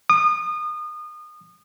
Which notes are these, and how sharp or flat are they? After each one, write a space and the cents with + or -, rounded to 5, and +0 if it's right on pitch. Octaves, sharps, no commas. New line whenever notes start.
D#6 -30